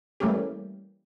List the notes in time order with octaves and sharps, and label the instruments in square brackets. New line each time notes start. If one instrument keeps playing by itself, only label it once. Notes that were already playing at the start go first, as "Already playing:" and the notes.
[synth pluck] E3 G3 A3 A#3 C#4 G4